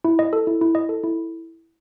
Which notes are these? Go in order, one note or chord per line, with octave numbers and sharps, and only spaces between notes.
E4
D#5
A4
E4
E4
D#5
A4
E4